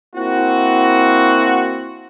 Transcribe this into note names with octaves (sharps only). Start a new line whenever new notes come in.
A#3 C4 E4 F#4